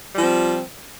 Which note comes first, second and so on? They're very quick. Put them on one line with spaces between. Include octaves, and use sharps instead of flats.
G3 F3 C4